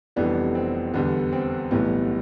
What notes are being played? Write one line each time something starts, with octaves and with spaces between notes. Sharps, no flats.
F1 F2 E3 G3 B3 D4
C4
E2 D3 G3 B3
C4
B1 A2 E3 G3 B3